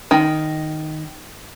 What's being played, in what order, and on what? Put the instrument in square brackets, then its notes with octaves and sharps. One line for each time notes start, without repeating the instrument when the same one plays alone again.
[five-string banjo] D#3